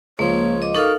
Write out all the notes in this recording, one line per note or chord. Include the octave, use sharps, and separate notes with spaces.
C#2 F3 A#3 C#5
D#5 D6
D#4 F#4 A4 A#4 F5